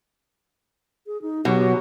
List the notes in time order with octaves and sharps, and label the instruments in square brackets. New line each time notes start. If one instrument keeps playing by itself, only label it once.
[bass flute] G#4
D#4
[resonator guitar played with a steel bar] B2 [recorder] F#3 [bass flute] G4